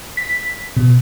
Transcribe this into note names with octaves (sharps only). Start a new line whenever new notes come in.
B6
B2